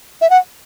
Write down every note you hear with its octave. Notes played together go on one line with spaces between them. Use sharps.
E5
F#5